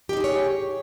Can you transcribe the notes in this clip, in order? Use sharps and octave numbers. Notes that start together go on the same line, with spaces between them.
D#4 G4 G#4 C5 C#5